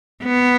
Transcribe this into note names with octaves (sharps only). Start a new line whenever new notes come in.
B3